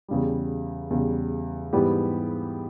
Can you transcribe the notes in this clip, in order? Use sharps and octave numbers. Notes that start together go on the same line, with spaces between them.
E2 C#3 G3
E2 C#3 G3
G#2 E3 G3 B3 G4